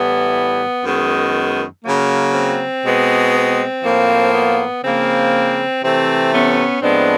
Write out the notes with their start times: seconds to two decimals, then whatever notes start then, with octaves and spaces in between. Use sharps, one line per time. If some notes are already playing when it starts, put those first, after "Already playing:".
Already playing: A2 E3 G3 B3
0.83 F#2 D#3 G#3 B3
1.83 C#3 F#3 A#3
2.33 C4
2.83 B2 G#3 B3
3.33 C4
3.83 A2 F3 A#3
4.33 B3
4.83 C#3 F3 A#3 C4
5.82 C3 E3 A3 C4
6.33 B3 C#4
6.82 A2 F3 G#3 B3 C4 D4